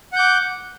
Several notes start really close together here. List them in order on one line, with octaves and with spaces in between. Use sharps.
F#5 G6 D6